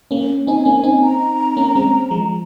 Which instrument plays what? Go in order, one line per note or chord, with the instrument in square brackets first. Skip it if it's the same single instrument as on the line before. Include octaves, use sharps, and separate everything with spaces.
[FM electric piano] A#3 C#4
[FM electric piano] C4 D#4 [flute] G#5
[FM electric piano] A#3 C#4
[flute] G#5
[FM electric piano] C4 D#4
[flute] A#5
[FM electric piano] A#3 C#4
G#3 C4
F3 G#3